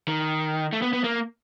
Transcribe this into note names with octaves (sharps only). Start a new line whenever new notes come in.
D#3
A3
B3
B3
A#3